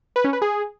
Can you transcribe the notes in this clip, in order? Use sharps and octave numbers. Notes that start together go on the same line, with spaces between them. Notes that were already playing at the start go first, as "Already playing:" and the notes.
B4
C#4
B4
G#4